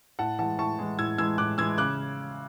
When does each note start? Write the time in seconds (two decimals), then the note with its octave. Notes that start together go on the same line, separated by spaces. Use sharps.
0.19 A2 F#5 A5
0.39 E3 G#3 F#5 A5
0.59 A2 A5 C#6
0.79 E3 G#3
0.99 A2 E6 G#6
1.18 E3 G#3 E6 G#6
1.38 A2 D6 F#6
1.58 E3 G#3 E6 G#6
1.78 C#3 D6 F#6